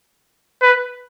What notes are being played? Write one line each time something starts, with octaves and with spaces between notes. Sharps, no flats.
B4